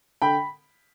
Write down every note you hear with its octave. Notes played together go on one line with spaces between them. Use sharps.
D3 G5 B5